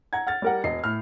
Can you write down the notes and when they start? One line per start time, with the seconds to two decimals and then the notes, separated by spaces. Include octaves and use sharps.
0.13 F#5 A#5 G#6
0.27 F#5 F6 A6
0.42 G3 A#4 F#5
0.64 E1 D#5 C7
0.84 A2 F6